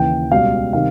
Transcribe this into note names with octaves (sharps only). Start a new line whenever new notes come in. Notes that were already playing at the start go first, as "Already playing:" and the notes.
Already playing: D#2 C#3 E3 G5
C#2 B2 G3 F5
C3 D#3 G3 F5